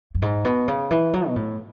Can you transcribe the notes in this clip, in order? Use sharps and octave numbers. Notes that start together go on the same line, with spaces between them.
F#2
G#2
B2
C#3
E3
F#3
B2
A2